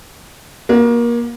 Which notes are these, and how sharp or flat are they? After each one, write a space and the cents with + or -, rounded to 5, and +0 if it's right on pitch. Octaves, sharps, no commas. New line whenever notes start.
A#3 +25 F#4 +0